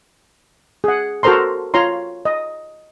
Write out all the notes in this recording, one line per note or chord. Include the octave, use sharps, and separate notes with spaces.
G#4 F#5
F#4 A4 A#4 C5 A#5 C6
F4 C#5 A#5 C6
D#5